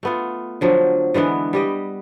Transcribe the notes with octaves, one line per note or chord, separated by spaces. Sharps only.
A3 B3 F4
D3 F3 F#3
D3 E3 G#3 B3
G3 G4 D#5